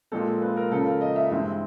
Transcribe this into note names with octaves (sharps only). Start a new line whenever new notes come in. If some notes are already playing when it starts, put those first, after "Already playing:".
A#2 F3 G#3 C4 A4
B4
A#4
C#2 C#3 F3 A4
A#4
D#5
E5
G2 E3 G#3 C4 E5
E5